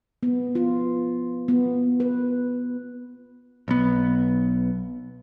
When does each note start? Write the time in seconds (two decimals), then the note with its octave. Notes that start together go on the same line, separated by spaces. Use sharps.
0.23 B3
0.55 F4
1.48 B3
2.00 B4
3.68 B1 B3